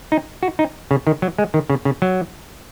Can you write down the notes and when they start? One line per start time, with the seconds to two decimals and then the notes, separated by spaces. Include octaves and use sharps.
0.12 D#4
0.43 F#4
0.59 D#4
0.91 C#3
1.07 D#3
1.22 F#3
1.38 G#3
1.54 D#3
1.70 C#3
1.85 C#3
2.02 F#3